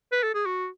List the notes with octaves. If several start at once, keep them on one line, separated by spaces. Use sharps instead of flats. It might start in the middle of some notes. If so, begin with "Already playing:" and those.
B4
A4
G#4
F#4